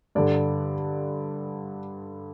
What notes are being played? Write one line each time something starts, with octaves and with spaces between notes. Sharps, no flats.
G2 D3 D5